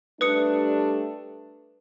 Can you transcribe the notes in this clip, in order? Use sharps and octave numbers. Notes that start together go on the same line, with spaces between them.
G3 A3 D4 B4 D#6 C#7